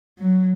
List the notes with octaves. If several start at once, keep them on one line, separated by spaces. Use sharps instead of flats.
F#3